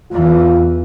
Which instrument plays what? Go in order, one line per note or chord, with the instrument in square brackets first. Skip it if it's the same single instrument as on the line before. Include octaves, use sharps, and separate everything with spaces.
[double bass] E2 E3 [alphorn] F4